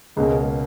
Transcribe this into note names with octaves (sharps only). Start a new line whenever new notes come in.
C#2 B2 G#3 A#3 C#4